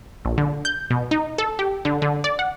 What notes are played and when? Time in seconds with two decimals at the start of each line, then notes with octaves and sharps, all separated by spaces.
0.25 A#1
0.38 D3
0.65 G6
0.90 B2
1.11 D#4
1.38 A4
1.59 G4
1.85 D3
2.02 D3
2.24 D5
2.39 F#5